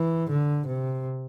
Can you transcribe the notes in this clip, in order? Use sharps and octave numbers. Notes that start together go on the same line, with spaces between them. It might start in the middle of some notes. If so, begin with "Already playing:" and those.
Already playing: E3
D3
C3